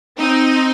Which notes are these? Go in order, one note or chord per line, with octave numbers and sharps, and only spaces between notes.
C4 D#4